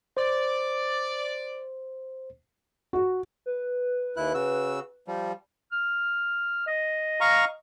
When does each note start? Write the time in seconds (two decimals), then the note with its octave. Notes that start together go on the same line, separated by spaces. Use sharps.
0.17 C5 D5
2.93 F#4
3.46 B4
4.17 D#2 E4 F#6
4.34 C#3 F#4 E6
5.07 F3 G3
5.72 F6
6.67 D#5
7.21 F5 A#5 C#6